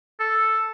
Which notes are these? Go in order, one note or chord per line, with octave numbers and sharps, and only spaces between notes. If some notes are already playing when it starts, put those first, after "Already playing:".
A4